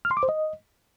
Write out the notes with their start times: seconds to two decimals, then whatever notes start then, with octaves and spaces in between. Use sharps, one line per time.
0.05 F6
0.11 C6
0.17 D6
0.23 C5
0.29 D#5